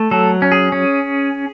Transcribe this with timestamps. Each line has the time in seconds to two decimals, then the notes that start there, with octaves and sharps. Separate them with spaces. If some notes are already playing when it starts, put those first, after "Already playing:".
Already playing: A3
0.11 F#3 A4
0.42 C#4
0.52 G#4
0.72 C#4